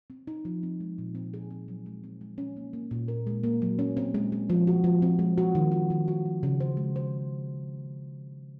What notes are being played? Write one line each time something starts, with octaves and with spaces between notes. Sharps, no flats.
C4
D#4
F3
C4
G#3
A#2
C4
G#4
C4
F#3
G#3
C4
G#3
C#4
A#3
A#3
A#2
A#4
G#3
A#3
F#3
C#4
C4
G#3
G#3
F3
F#4
F3
C4
G#3
F#4
D#3
F4
D#3
F#4
F3
C#3
C5
G#3
C5